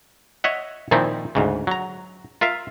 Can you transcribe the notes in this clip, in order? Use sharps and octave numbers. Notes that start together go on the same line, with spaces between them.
C#5 D#5 E5 F#5
A#2 D#3 F3 C4 D#4 E4
D2 G#2 C#3
F#3 A#5
F4 A#4 E5 F5